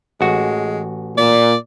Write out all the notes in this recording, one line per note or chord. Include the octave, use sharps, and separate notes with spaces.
A1 G#3 F#4
A#2 D5